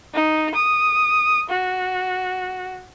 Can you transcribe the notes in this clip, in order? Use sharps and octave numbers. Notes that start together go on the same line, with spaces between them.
D#4
D#6
F#4